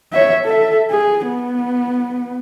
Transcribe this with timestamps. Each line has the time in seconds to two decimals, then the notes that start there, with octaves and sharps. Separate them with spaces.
0.13 C#5 E5
0.45 A4 E5
0.91 G#4
1.27 B3